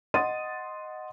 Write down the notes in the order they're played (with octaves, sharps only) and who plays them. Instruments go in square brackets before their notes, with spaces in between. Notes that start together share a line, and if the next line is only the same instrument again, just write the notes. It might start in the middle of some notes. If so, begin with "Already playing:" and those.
[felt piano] D#5 F#5 C6 D#6 A6 D#7